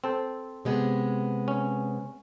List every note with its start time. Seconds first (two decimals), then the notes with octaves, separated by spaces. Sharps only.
0.04 C4 A4 C5
0.65 C3 G#3 B3
1.48 C#4